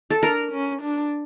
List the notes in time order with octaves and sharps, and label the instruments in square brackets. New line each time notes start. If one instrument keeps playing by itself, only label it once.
[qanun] A4
[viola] D4 [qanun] A#4
[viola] C#4
D4